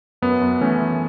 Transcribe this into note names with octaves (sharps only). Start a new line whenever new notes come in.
F#2 B3
F#2
E3 A3 C#4
E3